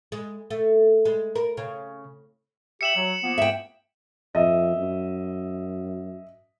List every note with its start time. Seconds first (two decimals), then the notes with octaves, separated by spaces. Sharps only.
0.12 G#3
0.50 A3
1.05 G#3
1.35 A#4
1.57 C#3
2.81 G4 E5 C#7 E7 F#7
2.96 F#3
3.23 F3 A#3 B3
3.38 E5 G5
4.35 F2 D#5 E5
4.77 F#2